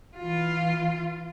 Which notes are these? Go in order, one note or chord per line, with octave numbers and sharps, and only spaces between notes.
E3 F4